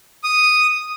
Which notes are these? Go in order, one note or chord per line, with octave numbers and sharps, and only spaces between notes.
D#6